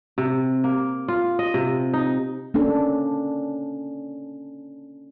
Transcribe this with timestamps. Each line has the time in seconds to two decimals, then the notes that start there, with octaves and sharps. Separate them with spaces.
0.18 C3
0.64 A#3
1.08 F4
1.39 D#5
1.54 C3
1.93 D#4
2.54 A#3 C#4 D4 A4